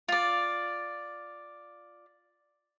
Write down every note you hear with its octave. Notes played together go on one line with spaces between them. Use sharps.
F4 D5